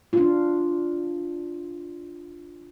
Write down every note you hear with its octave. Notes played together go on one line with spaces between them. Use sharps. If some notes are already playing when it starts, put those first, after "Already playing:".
D4 F4